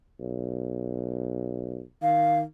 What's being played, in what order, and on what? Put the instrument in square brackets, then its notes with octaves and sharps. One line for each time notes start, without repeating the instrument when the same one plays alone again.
[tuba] B1
[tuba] D#3 [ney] F5